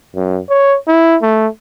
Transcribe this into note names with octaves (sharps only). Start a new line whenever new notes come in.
F#2
C#5
E4
A3